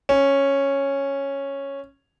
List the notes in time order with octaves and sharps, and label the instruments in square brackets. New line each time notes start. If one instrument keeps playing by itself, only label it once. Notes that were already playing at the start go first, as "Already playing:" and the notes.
[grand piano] C#4